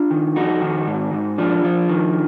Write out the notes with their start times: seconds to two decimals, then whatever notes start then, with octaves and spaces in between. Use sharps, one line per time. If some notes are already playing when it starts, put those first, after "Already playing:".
Already playing: D4 F4
0.11 D#3
0.36 F2 D#4 F#4
0.62 D#3
0.87 G#2
1.13 G#2
1.38 F3 D4 F4
1.64 F3
1.89 D#3